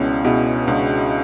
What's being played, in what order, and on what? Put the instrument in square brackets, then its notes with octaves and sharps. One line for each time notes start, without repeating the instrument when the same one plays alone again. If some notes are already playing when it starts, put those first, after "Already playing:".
Already playing: [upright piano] C#2 B2 [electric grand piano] B3 C#4 D4 E4
[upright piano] B2 [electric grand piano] E4 G#4
[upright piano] C#2 [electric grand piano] D4 F#4